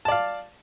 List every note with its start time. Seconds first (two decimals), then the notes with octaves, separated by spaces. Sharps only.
0.05 A5
0.08 D5
0.12 F5